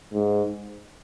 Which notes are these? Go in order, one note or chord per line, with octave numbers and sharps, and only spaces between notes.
G#2